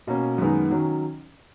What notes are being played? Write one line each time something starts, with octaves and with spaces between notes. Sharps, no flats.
B2 A#3 C#4
F#2 D#3 G#3 B3 D#4
D#3 F#3 C#4